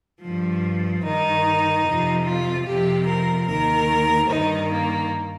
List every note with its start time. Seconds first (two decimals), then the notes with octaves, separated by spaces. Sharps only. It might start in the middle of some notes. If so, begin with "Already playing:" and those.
0.21 G2 F3
1.02 G2 D#3 D#4
1.85 F2 C3 F3
2.25 F4
2.66 F2 C3 F3 G4
3.06 A#4
3.47 D#2 D#3 A#4
4.29 G2 D#3 D#4
4.70 A#3